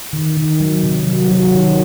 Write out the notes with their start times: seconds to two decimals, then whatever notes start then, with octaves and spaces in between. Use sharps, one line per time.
0.13 D#3
0.37 D#3
0.60 F#3
0.84 C3
1.07 F#3
1.31 F#3
1.55 D#3